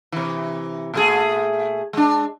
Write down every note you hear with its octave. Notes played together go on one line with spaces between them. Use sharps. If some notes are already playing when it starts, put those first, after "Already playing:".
C3 E3
A#2 A3 G#4
G#3 D4